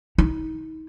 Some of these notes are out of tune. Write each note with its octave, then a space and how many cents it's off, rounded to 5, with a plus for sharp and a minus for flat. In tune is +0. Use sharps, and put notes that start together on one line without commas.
D#4 +35